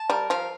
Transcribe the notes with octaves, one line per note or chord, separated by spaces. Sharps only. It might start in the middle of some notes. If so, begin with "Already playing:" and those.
Already playing: A5
G3 A#4
F3 F5